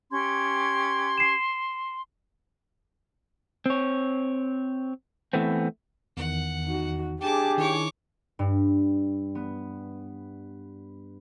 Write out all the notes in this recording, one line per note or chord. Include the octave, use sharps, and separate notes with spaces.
C#4 G4 C6 G#6
C7 E7
C4 C#5
E3 A3 B3 C4
E2 D#3 F#5
D#4 F#4
D4 G4 G#4 A5 D6
D#3 D#4 E4 C#5 D6
G2
B3